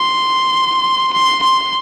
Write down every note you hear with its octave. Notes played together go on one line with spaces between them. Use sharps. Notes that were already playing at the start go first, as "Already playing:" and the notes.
Already playing: C6
C6
C6